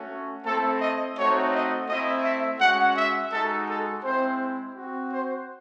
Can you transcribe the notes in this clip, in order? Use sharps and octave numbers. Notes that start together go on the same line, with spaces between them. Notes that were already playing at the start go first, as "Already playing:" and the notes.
Already playing: A3 C#4 F#4
A3 C4 E4 A4
D#5
A3 C4 D#4 F#4 C#5
D#5
A3 C4 E4 D#5
E5
G#3 C#4 F#4 F#5
E5
G#3 D#4 F#4 A4
A4
G#3 C4 E4 C5
C4 F#4
C5